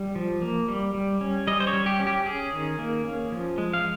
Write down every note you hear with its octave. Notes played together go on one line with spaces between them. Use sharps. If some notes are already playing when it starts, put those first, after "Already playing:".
Already playing: G3
F3
A#3
G3
G3
C#4
G3 D#5
C5
C#5
G3
G4
C#4
G4
C#4 G#4
D#3
A#3
C#4
F3
G#3
F5